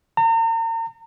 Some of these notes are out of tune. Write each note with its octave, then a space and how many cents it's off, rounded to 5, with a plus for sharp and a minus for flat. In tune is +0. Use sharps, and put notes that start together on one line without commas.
A#5 -40